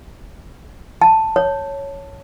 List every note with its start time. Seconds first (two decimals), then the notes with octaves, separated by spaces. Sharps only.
1.02 A5
1.36 C#5